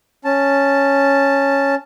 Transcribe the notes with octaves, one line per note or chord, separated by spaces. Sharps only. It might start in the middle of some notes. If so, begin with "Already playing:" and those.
C#4 A5